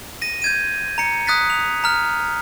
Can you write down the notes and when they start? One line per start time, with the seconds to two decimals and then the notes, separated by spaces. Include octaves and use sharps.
0.22 A#6 D#7
0.42 G6 G#6 D#7
0.98 A#5 C#7
1.27 D#6 F#6 A6 B6
1.50 F7
1.84 A#5 F6